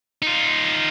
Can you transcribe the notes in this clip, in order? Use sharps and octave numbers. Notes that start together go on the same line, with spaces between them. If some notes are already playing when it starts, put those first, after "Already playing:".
D#4 F4